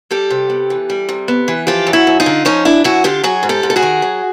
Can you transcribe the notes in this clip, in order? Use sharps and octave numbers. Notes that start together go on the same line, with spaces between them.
G3 G4 A4
C3
B3
E3
G3
C3
B3
E3
F3 F4 G4
F#2
E4 F#4
F#2
D#4 F4
D3
F3 C#4 D#4
F#2 D4 E4
F#2 E4 F#4
D3 F4 G4
F#3 F#4 G#4
G#2
G4 A4
G#2
A4
F#4 G#4
D#3
F#3